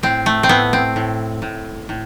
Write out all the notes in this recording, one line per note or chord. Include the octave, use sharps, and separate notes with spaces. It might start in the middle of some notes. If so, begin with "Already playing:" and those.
A2 C4
A3
C4
A2 B3
C4
A2
A2
A2